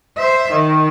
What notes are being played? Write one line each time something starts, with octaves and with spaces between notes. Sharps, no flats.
C5 E5
D#3